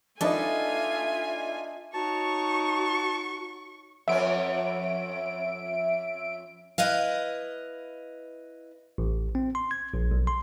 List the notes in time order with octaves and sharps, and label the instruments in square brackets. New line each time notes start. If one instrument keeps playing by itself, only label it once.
[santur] D4 D#5 [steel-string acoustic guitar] D#4 A4 B4 [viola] F4 G#5 [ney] E5
[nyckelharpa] D#4 C#5 [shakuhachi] F#4 [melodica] A5 [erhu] C#6
[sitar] F2 B3 C#4 [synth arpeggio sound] E5 D7
[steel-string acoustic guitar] E4 B4 D#5 F5
[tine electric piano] A1
C4
C6
G#6
A#1
B1
C6